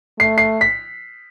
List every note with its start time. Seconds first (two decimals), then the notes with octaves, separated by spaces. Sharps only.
0.20 A3 C7
0.38 C7
0.61 B6